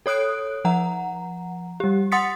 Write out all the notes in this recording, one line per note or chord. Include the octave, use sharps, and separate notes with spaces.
A4 C#5 D#6 F#6 D7
F3 F#5 A#5
G3 G4
F#5 C6 D#6 A6 B6 C#7